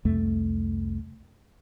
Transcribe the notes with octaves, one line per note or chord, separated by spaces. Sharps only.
C2 F2 A3